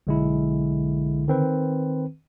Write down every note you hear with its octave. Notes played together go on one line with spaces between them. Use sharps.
B1 D3 G#3 E4
D#3 C4 B4